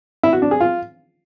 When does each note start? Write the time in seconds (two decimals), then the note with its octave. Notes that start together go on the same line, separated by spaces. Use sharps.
0.23 E4
0.33 F#4
0.42 D4
0.51 G#4
0.60 F4